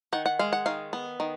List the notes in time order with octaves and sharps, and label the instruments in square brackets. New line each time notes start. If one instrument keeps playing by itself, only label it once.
[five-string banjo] D#3 F#5
F#5
G#3 F5
F#5
D#3 F5
B3
D#3